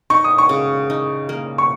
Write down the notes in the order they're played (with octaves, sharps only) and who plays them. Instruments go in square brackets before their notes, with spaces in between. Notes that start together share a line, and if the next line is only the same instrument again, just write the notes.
[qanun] D#4 [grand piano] C#6
[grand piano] D#6
C#6
[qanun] C#3
D#4
A#3
[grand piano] C#6